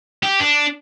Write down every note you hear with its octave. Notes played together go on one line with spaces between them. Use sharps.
G4
D4